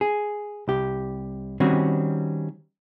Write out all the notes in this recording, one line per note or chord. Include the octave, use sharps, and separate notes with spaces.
G#4
C2 G4
D#3 G3 C4 C#4 F#4